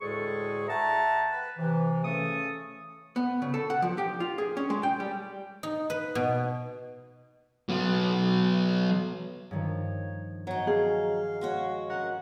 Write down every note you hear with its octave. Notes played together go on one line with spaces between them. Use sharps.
D2 A2 G#3 G#4 A4 C#6
E5 F#5 G5 A5 A#5
B4
C3 E3
C#3 A3 C#4 A4 C#6 D#6
B3
C#3
A4
F#5
F3
G4
F4
G#4
C#4
G#3
G5
G3
D#4
B4
B2
F#3 B3
G2 D#3 F3 C#5
F#3 D#4 C#5
G#4 F5
G#3 F#4 C#5
C#4 A#4 F#5